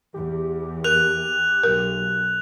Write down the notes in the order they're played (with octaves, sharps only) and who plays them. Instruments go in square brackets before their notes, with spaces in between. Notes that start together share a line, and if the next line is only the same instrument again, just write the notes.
[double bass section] E2 [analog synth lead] G4
[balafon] A#4 [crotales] F#6 F7
[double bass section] B1 [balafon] A#4